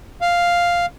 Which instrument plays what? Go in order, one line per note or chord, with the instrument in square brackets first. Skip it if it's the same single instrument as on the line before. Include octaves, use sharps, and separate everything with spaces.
[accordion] F5